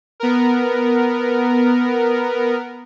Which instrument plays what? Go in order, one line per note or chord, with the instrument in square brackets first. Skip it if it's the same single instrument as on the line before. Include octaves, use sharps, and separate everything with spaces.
[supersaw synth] B3 A#4